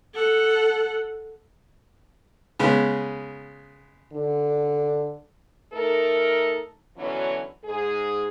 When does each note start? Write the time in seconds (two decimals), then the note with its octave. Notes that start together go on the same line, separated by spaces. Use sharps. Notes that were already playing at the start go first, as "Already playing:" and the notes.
0.14 A4 F#5
2.59 C#3 G#3 B3
4.13 D3
5.72 A3 D#4 A4 A#4
6.97 B2 D3 E3 F#3 C#4
7.64 G#2 G#4